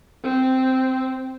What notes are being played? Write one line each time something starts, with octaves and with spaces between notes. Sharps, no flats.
C4